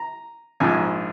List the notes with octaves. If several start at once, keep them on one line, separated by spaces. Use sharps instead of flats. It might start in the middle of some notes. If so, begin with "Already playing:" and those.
Already playing: A#5
A#1 G#2 F3 G#5